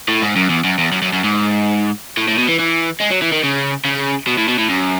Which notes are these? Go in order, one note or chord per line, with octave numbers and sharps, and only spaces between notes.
A2
G#2
F#2
E2
F#2
E2
F#2
F#2
F#2
G#2
A2
A2
B2
E3
E3
G#3
F#3
E3
D#3
C#3
C#3
B2
A2
B2
A2
F#2